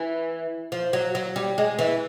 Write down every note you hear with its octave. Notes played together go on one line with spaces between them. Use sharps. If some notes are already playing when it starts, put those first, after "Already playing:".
Already playing: E3
F3
F#3
F#3
G3
G#3
E3